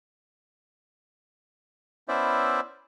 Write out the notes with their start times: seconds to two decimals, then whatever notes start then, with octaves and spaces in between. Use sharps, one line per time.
2.08 B3 C#4 E4 C5 D5 E5